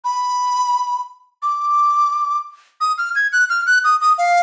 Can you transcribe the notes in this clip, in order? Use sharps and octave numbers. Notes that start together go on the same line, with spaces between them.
B5
D6
D#6
F6
G#6
F#6
F6
F#6
D#6
D#6
F5